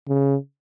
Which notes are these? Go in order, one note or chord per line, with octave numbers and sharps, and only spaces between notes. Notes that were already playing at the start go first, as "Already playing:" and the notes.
C#3